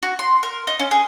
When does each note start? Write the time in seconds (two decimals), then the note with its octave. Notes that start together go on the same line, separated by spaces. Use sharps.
0.03 F#4
0.19 C6
0.43 A#4
0.67 D#4
0.79 C#4
0.91 G#4